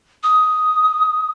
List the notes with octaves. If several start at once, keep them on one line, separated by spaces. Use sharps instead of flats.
D#6